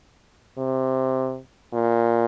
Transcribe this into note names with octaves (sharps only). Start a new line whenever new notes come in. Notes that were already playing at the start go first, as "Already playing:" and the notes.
C3
A#2